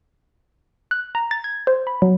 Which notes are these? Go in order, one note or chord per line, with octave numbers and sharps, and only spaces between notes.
F#6
A#5
A6
G#6
C5
B5
F#3